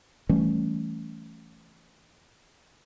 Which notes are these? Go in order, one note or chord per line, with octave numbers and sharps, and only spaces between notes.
E3 G3 A3 C#4